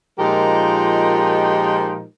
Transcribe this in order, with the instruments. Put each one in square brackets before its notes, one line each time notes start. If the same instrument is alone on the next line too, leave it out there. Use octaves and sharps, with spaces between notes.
[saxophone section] A#2 F3 G#3 D#4 G4 A#4